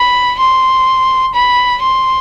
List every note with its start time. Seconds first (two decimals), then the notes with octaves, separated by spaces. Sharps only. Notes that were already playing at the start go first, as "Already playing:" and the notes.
Already playing: B5
0.39 C6
1.34 B5
1.82 C6